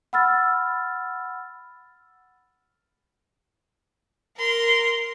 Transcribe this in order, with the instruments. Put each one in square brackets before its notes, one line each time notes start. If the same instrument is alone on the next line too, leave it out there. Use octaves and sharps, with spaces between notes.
[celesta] F#5 B5 E6 F6 A6
[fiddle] A#4 C6